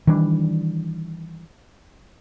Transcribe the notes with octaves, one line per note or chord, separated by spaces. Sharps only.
D#3 E3 G3 D4